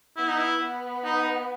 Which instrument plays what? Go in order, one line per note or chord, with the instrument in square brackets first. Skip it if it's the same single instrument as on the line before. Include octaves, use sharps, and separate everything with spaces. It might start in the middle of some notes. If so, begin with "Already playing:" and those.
[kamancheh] B3 [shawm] E4
[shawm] D#4
E4
[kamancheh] B3
[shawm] D#4